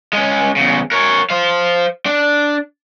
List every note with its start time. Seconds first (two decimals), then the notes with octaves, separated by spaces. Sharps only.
0.13 G#3 C#4
0.56 E2 C#3
0.92 A#4 C#5
1.30 C5 F5
2.06 D4